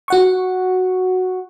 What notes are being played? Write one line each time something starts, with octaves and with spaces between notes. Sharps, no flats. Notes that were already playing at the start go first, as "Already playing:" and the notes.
F#4 F#5 C#6